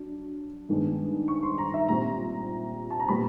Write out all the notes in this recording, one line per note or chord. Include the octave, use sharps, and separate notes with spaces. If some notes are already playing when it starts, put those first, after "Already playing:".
Already playing: F#3 D4
G2 D#3 G#3 B3 D4
C#6
C6
A#5
E5
A#2 G3 C4 A#5
A5
A#5
A#2 G3 B3 B5